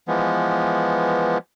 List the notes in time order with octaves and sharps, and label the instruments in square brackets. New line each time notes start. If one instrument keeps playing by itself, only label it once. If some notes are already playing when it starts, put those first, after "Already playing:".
[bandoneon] E3 F3 G#3 B3